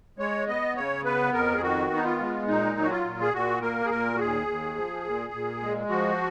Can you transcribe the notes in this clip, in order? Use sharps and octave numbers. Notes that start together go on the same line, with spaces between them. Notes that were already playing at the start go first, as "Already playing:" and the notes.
G#3 C#5
B3 D#5
C#3 C#5
B3 B4
F2 A#4
G#4
D#3 F#4
B3
D#4
F4
G#3
A#2 D#4
F#3
F#4
F4
A#2
G#4
A#2 F#4
A#3 A#4
G#4
A#2 A#4
F#4
D#2 G#4
D#2
F3
A#2
A#2
G#3
F3 F#4